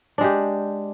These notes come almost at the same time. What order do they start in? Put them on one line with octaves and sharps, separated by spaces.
D4 G#3 G4